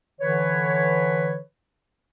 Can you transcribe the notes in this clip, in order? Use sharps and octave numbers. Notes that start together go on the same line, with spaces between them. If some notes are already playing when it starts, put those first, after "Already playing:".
D3 E3 B4 C#5